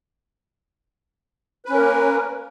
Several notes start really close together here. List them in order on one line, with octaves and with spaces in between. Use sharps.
B4 C#4 A#4 A#3